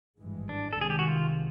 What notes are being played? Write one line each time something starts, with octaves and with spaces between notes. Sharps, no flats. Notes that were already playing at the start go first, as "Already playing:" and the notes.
G#1 G2 E3 G#3
D4
A4
C2 C3 D#3 G#3 G#4
G4
F#4
F4